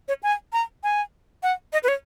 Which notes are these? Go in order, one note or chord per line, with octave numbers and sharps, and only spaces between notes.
C#5
G#5
A#5
G#5
F#5
D#5
B4
C#5